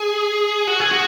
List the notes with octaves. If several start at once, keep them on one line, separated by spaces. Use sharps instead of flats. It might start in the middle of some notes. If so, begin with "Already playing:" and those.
Already playing: G#4
F#4
G#4
F#4